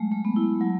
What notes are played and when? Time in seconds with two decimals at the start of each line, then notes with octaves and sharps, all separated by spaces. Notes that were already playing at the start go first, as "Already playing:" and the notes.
Already playing: F#3 G#3 A3
0.12 A3
0.25 B3
0.36 E4
0.61 F#3